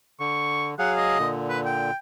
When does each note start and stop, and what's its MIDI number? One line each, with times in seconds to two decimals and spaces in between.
0.20 0.75 50
0.20 0.68 85
0.79 1.18 54
0.79 1.18 68
0.79 1.18 77
0.79 0.91 78
0.97 1.29 75
1.19 1.91 46
1.19 1.91 50
1.49 1.59 71
1.65 1.96 79